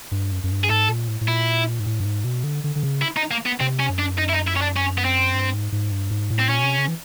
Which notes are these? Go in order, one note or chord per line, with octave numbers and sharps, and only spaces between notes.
G2
F#2
F#2
G2
G#4
G#2 A4
A#2
A2
A2
A#2 E4
G#2
A2
G2
G#2
B2
D3
D3
D3
C#3
E4
D#4
A#3
B3
C3 C4
C#4
F#2
D4
D#4
E4
D#4
E4
C#4
D4
C#4
B3
C4
G2
G#2
G#2
G2
G#2
A2
C4
A#2 C#4
B2
C3
C#3
E3